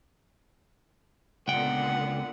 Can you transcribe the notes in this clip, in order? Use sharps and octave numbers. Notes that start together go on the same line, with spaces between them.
C#2 A#2 D3 B3 F#5 G5